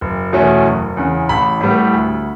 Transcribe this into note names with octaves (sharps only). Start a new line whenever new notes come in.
F#1
E2 B2 A3 C#4
F#1
E2 C#3
A1 B5
A2 G3 B3
D2